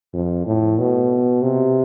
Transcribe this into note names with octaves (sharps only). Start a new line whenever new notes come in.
F2
A2
B2
C3